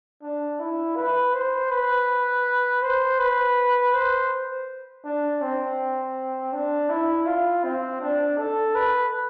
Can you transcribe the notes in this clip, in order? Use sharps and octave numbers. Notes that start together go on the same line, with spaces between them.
D4
E4
B4
C5
B4
C5
B4
C5
D4
C4
D4
E4
F4
C4
D4
A4
B4